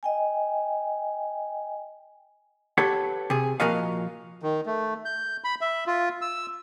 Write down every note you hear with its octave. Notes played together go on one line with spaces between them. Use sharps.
D#5 G5 G#5
G4 A4 B4 C#5 F#5
C3 G#4
A#2 F3 F#4 A#4 D#5 F5
D#3
A3
G6
B5
E5
F4
E6